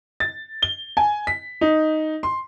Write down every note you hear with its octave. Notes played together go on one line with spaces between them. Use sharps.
A6
G7
G#5
B6
D#4
C6